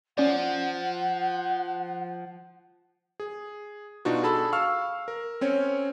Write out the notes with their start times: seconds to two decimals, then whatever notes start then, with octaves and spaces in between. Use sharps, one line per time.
0.18 F3 C#4 D5 F#5
3.20 G#4
4.05 B2 D4 D#4 F4 F#4
4.23 G#4 A4 A5 B5 E6
4.53 F5 C#6 E6 F6
5.08 A#4
5.41 C4 C#4 C#5